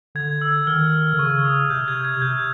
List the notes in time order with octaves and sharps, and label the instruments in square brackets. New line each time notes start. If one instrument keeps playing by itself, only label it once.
[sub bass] D3 [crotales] G#6
[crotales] E6
[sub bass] D#3 [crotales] F6
[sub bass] D3
[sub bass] C#3 [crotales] C#6
[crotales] D#6
[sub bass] C3 [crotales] G6
[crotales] G#6
G#6
[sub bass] C3 [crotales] G6